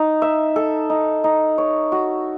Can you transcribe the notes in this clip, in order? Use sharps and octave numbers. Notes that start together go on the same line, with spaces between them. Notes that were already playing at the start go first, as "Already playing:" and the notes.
Already playing: D#4
E5
A4
D#4
D#4
C#5
F#4